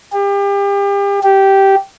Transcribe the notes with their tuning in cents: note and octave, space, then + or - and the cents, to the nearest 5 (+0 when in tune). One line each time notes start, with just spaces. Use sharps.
G4 +35
G4 -10